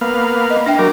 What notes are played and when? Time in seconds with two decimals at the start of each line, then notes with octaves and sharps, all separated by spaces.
0.01 A#3 B3 F5
0.50 D#5
0.66 D4 E5 G5
0.79 F#3 A#4 A#5 D6